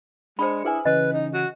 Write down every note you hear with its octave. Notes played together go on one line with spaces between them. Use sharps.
G#3 D4 C5 B5 D#6 C#7
E4 G#4 B4 G#5
C#3 E3 C#4 B4 D#5
D#4
F#4